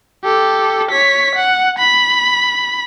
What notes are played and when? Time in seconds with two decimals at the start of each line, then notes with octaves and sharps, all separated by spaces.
0.23 G4 A4
0.91 C#5 B6
1.35 F#5
1.78 B5